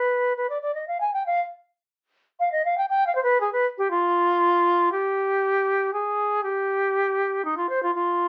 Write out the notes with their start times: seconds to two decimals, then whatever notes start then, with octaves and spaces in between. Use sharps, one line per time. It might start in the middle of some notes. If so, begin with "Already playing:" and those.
Already playing: B4
0.37 B4
0.50 D5
0.62 D5
0.75 D#5
0.88 F5
1.01 G#5
1.14 G5
1.26 F5
2.40 F5
2.52 D#5
2.65 F5
2.78 G5
2.90 G5
3.07 F5
3.15 C5
3.23 B4
3.41 G#4
3.52 B4
3.78 G4
3.91 F4
4.92 G4
5.93 G#4
6.43 G4
7.45 D#4
7.57 F4
7.69 C5
7.83 F4
7.95 F4